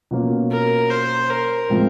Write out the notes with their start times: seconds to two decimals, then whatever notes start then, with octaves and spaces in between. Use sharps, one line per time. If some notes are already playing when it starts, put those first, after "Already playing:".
0.11 B2 F#3 A#3 C#4 F4
0.51 A#4
0.90 C5
1.30 A#4
1.70 A2 F3 G#3 C4